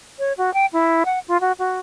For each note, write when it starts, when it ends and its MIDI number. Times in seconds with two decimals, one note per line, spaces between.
0.19 0.33 73
0.38 0.53 66
0.54 0.66 79
0.73 1.03 64
1.05 1.19 78
1.28 1.40 65
1.41 1.52 66
1.59 1.80 66